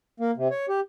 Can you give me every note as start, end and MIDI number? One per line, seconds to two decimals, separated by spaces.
0.20 0.31 58
0.37 0.48 48
0.51 0.66 73
0.69 0.80 67